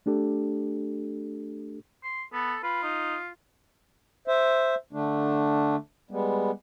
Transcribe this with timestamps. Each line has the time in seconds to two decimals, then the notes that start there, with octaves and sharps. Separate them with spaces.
0.06 A3 D4 G4 A4
2.04 C6
2.33 B3 A4
2.63 F4 B4
2.83 D#4
4.28 C5 E5
4.93 D3 A3 D4
6.11 G3 G#3 B3